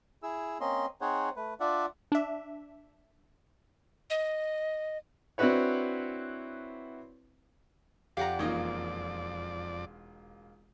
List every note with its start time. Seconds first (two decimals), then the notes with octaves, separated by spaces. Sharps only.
0.23 E4 G#4 E6
0.60 A#3 C4 C#4 D#5 C6
1.01 C4 D#4 G#4 C5 C#5 F#5
1.36 A3 B4
1.60 D4 F4 D5 E5 F#5
2.12 D4 E5
4.10 D#5
5.38 C4 D4 E4 F#4 B4 C#5
8.17 F2 G4 D5 F5 F#5 A#5
8.39 E1 A#3 C#4 D#4 F4